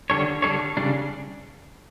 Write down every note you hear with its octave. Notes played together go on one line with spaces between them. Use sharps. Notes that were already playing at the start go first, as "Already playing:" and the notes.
D3 G3 D4 A4 C#5
D3 G3 D4 A4 C#5
C#3 G3 D4